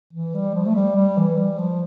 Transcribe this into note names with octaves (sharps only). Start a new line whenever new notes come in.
E3
G3
F3
A3
G3
G3
E3
G3
F3